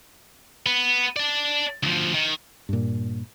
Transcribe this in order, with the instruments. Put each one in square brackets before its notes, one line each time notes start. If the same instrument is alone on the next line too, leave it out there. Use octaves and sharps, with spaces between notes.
[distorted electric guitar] B3
D5 A5
D2 F3
D#3
[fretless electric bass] G2 A#2